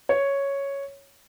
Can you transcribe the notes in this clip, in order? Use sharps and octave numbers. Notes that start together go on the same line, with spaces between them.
C#5